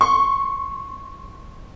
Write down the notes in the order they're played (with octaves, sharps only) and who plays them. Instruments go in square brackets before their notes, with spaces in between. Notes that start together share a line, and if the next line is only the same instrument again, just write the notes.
[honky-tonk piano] C6 C#6